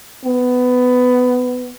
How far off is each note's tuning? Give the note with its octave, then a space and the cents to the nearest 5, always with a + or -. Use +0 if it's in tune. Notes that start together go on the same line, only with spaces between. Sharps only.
B3 +15